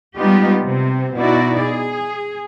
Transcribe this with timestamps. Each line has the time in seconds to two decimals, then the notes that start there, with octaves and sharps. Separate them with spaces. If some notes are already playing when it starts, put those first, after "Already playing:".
0.18 G3 G#3 B3 D#4 F4 G4
0.64 C3 C4
1.17 B2 D#4 E4 F#4 D5
1.62 G#4